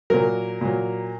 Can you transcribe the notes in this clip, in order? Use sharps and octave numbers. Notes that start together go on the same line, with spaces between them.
A#2 F#3 A#4
A#2 F#3